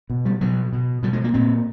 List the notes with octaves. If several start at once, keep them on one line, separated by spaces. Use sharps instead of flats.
B2
G3
B2 F#3
B2
B2 G3
G#3
A#3
A#2 C4